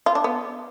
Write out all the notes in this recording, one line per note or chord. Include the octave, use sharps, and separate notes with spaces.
F4
D4
B3